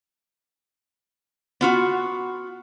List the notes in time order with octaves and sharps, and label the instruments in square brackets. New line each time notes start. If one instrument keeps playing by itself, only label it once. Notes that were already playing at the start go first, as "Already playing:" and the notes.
[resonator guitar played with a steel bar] B3 F4 F#4